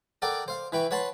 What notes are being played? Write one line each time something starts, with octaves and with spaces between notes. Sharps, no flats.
A4 A#4 D5 F#5 G5
C5 F5
E3 B4 G5 C#6
B4 C#5 F#5 A5 B5 C6